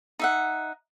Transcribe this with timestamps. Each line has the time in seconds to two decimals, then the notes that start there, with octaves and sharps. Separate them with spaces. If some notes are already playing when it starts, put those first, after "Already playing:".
0.19 D#4 E5 F#5